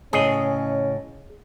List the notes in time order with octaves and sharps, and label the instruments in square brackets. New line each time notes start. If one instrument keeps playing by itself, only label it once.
[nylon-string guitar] A2 C#3 C#5 [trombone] C#4 [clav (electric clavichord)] G#4 D#5